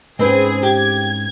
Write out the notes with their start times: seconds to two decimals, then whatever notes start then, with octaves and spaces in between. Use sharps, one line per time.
0.19 G#2 C4 C#4 G#4 B4
0.63 G4 G#6